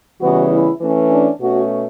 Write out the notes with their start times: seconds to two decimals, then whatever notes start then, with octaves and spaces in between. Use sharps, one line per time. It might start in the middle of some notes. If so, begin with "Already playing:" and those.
0.21 C#3 E3 G3 B3 F#4
0.51 E4
0.81 E3 A3 C#4
1.11 D4
1.40 B2 A3 C#4 F#4